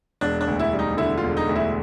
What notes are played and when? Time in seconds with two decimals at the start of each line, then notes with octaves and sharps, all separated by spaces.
0.21 E1 D4
0.41 D4
0.48 D2
0.59 E4
0.73 G3
0.79 D#4
0.97 D3 E4
1.17 F4
1.24 E1
1.37 D#4
1.49 D2
1.55 E4